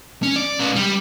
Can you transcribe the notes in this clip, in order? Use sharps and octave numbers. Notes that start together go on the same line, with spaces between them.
C#4
D5
C#4 B4
G3